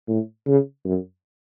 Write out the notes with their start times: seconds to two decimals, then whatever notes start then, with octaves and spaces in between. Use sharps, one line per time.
0.08 A2
0.46 C#3
0.85 F#2